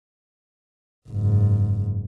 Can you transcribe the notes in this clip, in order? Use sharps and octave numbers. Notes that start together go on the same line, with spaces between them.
F#1 G#2